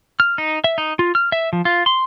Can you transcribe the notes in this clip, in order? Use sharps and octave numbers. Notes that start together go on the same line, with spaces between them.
F6
D#4
E5
D#4
F4
F6
E5
F3
F4
C6